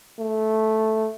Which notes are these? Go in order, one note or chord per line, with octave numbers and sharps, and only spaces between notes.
A3